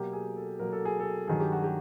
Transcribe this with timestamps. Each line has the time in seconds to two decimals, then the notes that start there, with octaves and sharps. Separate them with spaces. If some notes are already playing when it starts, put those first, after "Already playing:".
Already playing: B2 F#3 A#3 G4
0.13 G#4
0.37 A4
0.59 B2 F#3 A#3 A#4
0.72 A4
0.85 G#4
1.00 A4
1.28 G2 D#3 F#3 G#4
1.40 G4
1.52 F#4
1.64 G4